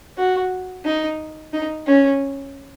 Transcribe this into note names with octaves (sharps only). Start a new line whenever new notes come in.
F#4
D#4
D#4
C#4